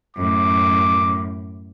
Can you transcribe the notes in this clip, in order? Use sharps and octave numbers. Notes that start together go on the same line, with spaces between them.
F#2 A2 D6